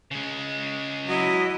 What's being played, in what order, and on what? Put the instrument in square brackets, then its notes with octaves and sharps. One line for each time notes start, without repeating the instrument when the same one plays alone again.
[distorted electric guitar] C#3 G#3
[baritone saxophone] F#3 [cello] E4 D#5